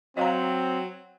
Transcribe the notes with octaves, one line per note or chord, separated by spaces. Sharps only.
F#3 C4 D#5 F5 A#5